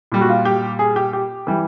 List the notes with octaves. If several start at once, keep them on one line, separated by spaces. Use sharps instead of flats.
A#2 G3
F#4
F4
G4
G#4
G4
G4
E3 G3